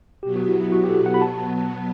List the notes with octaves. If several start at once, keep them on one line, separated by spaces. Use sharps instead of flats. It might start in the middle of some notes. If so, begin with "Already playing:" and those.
B2 F#3 B3 G4
F#4
E4
E4
F#4
G4
A4
F#5
B5
A5